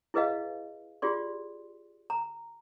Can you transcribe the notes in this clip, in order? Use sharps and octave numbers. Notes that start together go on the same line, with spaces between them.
E4 G#4 B4 D#5 F5
F4 G4 G#4 D5 C6
A#5